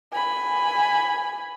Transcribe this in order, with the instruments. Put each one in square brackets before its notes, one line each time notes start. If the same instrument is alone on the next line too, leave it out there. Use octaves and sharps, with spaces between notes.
[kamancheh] G#5 B5